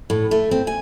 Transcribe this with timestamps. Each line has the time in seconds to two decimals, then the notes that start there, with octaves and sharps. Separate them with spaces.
0.10 A2
0.31 A3
0.51 C4
0.67 G#5